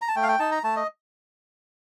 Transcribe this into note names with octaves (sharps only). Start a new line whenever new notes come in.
A#5
A5
A3 G5
F5
G5
D#4 A5
A#5
A3 A5
D#5